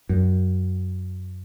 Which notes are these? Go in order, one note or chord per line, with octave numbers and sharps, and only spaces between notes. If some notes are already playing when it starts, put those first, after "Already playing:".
F#2